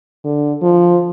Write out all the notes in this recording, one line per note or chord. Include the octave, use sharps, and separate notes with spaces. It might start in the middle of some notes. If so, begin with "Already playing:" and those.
D3
F3